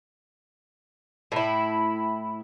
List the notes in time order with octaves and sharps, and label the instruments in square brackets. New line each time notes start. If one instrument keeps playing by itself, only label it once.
[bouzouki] A2 E4